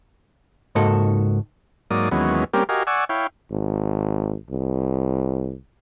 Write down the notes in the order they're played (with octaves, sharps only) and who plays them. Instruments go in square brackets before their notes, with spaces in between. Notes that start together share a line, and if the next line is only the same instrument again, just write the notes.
[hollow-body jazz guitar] C#2 G#2 A#3 D#4 F#4 A4
[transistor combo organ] G#2 F#3 A#3 D5 D#6
D#2 E3 F#3 G#3 B3 C#4
G3 A#3 C4 C#4 G4 A#4
F#4 G4 A#4 D#5 F5 G#5
D5 F#5 G#5 C#6 E6
E4 C#5 F5 G5
[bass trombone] G#1
C2